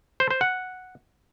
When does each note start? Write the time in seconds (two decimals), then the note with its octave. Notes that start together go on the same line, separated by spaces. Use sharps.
0.20 C5
0.31 C5
0.41 F#5